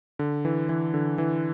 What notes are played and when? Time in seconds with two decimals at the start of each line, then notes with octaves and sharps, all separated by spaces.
0.19 D3
0.45 E3
0.69 E3
0.94 D3
1.18 E3